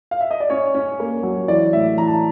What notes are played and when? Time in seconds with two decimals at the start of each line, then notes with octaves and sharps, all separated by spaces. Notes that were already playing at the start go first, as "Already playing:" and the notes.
0.11 F5
0.21 E5
0.31 D#5
0.40 D5
0.50 C#4 C#5
0.75 C#4
1.00 A#3
1.23 F#3
1.48 E3 D5
1.73 A2 E5
1.97 E3 A#5
2.08 A5